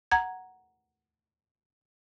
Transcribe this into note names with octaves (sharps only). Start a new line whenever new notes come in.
F#5 A#5 G#6